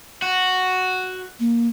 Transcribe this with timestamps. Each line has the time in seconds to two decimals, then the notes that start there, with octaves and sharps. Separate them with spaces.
0.22 F#4
1.40 A#3